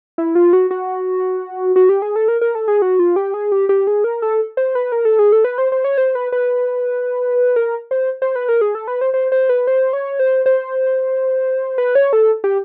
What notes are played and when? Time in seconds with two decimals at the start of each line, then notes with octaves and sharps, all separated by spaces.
0.18 E4
0.35 F4
0.53 F#4
0.71 F#4
1.76 F#4
1.89 G4
2.02 G#4
2.16 A4
2.28 A#4
2.41 A#4
2.55 A4
2.68 G#4
2.82 F#4
2.99 F4
3.16 G4
3.34 G#4
3.52 G4
3.69 G4
3.87 G#4
4.04 A#4
4.22 A4
4.57 C5
4.75 B4
4.92 A#4
5.05 A4
5.19 G#4
5.32 A4
5.44 B4
5.58 C5
5.72 C5
5.84 C#5
5.98 C5
6.15 B4
6.32 B4
7.56 A#4
7.91 C5
8.22 C5
8.36 B4
8.49 A#4
8.61 G#4
8.75 A4
8.88 B4
9.01 C5
9.14 C5
9.32 C5
9.49 B4
9.67 C5
9.93 C#5
10.19 C5
10.46 C5
11.78 B4
11.95 C#5
12.13 A4
12.44 G4